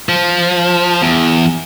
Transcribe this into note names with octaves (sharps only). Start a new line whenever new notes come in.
F3
E2